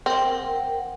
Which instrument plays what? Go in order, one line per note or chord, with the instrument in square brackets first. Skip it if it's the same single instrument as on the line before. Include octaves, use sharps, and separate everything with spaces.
[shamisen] C4 [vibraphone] A#4 F#5 G5